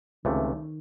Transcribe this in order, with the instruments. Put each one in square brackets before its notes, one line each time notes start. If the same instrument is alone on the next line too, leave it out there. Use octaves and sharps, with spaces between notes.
[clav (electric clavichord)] C#2 C3 E3 A3 [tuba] D#3